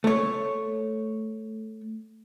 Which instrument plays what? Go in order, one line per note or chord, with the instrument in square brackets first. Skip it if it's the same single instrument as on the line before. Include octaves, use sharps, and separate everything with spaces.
[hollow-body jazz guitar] A3 C#5